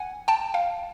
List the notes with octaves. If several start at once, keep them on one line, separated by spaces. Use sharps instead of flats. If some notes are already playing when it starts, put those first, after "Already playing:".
Already playing: F#5 G#5
G5 A5
F5 G5